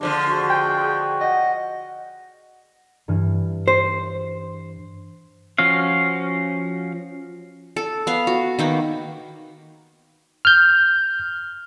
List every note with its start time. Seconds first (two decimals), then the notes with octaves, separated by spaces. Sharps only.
0.01 D3 F3 G#3 D4
0.30 F#4 G#4
0.50 G5
1.21 D#5 F#5
3.08 G2 E3 F6
3.68 C5
5.58 F3 C#4 F#4 F5
7.76 A4
8.07 B3 F5
8.27 F#4
8.59 D#3 A#3 B3
10.45 F6 G6